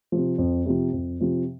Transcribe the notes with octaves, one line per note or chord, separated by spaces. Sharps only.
C3 F3
F2
C3 F3
F2
C3 F3